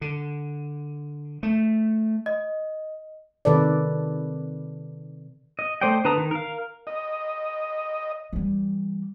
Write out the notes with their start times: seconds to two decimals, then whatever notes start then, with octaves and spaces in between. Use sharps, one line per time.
0.01 D3
1.43 A3
2.26 D#5
3.45 C3 D#3 A4 B4 D5
5.59 D#5
5.81 A3 C5 D5 D#5 G5
6.05 D3 B4 A5 A#5 D#6
6.17 D#3
6.31 A#4 F5
6.87 D#5
8.33 E3 G3